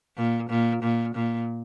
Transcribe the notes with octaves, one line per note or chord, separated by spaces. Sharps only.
A#2
A#2
A#2
A#2